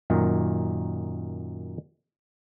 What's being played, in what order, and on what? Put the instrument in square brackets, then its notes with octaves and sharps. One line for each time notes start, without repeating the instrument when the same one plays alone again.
[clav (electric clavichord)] F#2 A#2 D#3